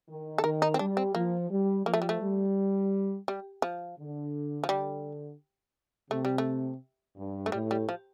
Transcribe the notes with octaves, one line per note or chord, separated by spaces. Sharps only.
D#3
A4
D#3 A#4
D#4
C4
G3 D4
C4
F3 A#3
G3
F3 A#3
A3
G3
A3
G3
G3
F3
D3
F3
D3 G3
C3 A3
G3
A3
G2
A3
A2 G3
G3
F3